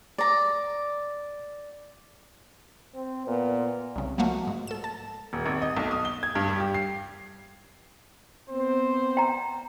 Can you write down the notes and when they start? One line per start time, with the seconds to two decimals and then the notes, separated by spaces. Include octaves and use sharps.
0.18 D5 A#5
2.95 C4
3.27 A#2 B3
3.96 C2 C#3
4.18 F3 F#3 A3 A#3 F#4
4.47 G#2
4.67 A4 E7
4.84 A5
5.33 D#1
5.46 G#1
5.62 D#5
5.77 B1
5.91 D#6
6.05 G7
6.23 G#6
6.35 G2
6.48 G3
6.60 G4
6.74 C7
8.49 B3 C4 C5
9.17 G5 A#5